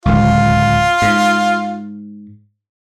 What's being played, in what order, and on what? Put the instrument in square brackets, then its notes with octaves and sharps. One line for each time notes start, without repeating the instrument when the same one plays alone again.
[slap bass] D1 C#2 [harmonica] F4
[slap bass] G#2